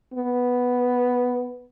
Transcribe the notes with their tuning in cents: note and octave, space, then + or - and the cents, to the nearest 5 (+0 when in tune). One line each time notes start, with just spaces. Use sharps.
B3 +0